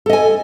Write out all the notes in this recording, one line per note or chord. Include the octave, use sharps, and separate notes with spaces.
A4 D#5 G#5